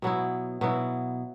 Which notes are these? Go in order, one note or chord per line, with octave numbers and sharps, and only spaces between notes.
B2 F#3 B3 E4
B2 F#3 B3 E4